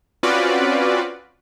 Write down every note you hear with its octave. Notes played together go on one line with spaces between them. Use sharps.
C4 C#4 F4 F#4 B4 D5